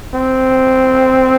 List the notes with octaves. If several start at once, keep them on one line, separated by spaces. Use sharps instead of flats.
C4